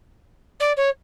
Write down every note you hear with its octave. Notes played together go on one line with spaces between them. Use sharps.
D5
C#5